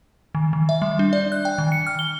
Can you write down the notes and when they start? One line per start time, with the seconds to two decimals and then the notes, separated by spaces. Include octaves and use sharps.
0.35 D#3
0.53 D#3
0.69 E5
0.82 G3
0.99 D4
1.13 D5
1.32 F#6
1.45 G5
1.58 D#3
1.72 C#7
1.87 F6
1.99 G7